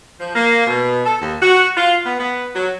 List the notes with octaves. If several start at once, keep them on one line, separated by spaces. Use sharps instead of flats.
F3
A#3
B2
A4
D#2
F#4
F4
B3
B3
F#3